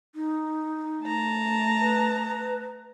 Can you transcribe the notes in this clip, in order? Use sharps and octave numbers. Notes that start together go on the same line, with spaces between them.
D#4
A3 A5 A#5
B4